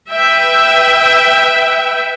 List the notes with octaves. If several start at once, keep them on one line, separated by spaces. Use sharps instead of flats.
B4 E5 G5